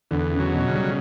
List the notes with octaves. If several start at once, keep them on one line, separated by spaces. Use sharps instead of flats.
E2 D3
C#3
F#3
B2
C#3
G3